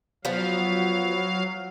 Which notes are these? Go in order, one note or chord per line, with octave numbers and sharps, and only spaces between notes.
F3 F#3 B3 F5